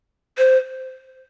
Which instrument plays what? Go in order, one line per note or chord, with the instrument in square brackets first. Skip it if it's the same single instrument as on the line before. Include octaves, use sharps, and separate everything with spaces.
[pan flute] C5